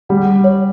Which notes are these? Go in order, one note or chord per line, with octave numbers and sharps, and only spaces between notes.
G3 F#5
C#5